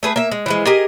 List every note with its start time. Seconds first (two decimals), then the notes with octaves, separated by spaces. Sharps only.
0.03 A3 G#4 B4
0.16 A#3 E5
0.31 G#3
0.46 E3 F3 G#3
0.66 G4 G#4 A#4 D#5